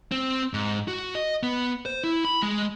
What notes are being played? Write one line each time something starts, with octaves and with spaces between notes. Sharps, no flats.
C4
G#2
F#4
D#5
B3
C5
E4
B5
G#3